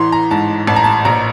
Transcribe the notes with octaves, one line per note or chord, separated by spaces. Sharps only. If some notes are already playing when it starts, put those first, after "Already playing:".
Already playing: A1 E3 A#5 C6
A#5
G#2 A5
A1 A5
A#5
A5
A#1 A#5